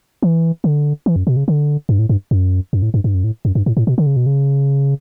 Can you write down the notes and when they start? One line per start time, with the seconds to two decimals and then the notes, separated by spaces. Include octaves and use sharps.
0.22 E3
0.64 D3
1.06 E3
1.16 F#2
1.27 B2
1.37 C#3
1.48 D3
1.89 G2
1.99 A2
2.09 G2
2.31 F#2
2.73 F#2
2.82 A2
2.94 G2
3.04 G2
3.14 F#2
3.24 A2
3.45 F#2
3.55 G2
3.66 A2
3.77 A2
3.87 B2
3.98 D3
4.06 C#3
4.16 B2
4.26 C#3